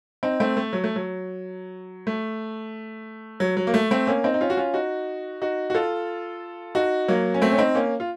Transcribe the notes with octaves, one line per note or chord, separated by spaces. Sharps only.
C4 D#4
A3 C4
A3
F#3
A3
F#3
A3
F#3
F#3
A#3
A3
A3 C4
A#3 C#4
C4 D#4
D#4
C#4 F4
F#4
C#4 F4
D#4 F#4
D#4 F#4
F#4
F4 A4
D#4 F#4
F#3 A#3
C#4
A3 C4
C#4
C4 D#4
A#3 C#4
F4